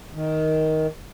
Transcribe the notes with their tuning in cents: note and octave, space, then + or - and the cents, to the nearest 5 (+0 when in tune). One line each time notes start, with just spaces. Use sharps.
D#3 +10